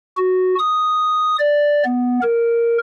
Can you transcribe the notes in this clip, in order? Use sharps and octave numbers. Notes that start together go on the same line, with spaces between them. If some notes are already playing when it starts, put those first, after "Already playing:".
F#4
D#6
D5
B3
A#4